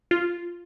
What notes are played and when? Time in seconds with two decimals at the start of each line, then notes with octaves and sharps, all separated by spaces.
0.11 F4